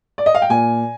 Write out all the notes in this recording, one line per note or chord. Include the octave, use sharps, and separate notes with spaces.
D5
D#5
F5
G5
A#2 G#5